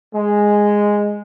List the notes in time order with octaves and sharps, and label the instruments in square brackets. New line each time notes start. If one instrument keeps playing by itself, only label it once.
[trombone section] G#3